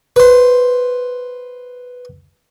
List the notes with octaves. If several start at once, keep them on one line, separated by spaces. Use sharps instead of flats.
B4 C5